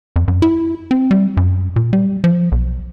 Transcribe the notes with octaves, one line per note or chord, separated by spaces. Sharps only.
F2
F#2
E4
C4
G3
F#2
A#2
G3
F3
B1